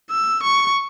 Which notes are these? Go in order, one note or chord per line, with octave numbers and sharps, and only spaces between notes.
E6
C#6